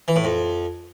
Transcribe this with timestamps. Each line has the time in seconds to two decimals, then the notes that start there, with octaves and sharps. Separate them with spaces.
0.08 E3
0.16 A2
0.24 F2